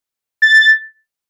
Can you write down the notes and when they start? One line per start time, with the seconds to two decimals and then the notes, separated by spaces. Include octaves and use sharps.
0.42 A6